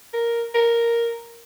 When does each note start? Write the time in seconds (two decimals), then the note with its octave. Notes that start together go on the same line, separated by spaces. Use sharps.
0.14 A#4
0.54 A#4